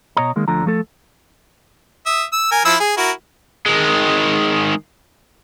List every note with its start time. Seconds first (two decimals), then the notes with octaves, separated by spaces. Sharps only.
0.17 B2 C#5 D#5 A#5
0.36 D#3 G#3 A#3
0.48 D2 D3 F3 A#5
0.66 F3 A3 A4
2.06 E5 D#6
2.32 E6
2.51 A#4 G#5
2.65 F3 E4 E6
2.80 G#4
2.97 E4 F#4 A#4
3.66 D#3 G#3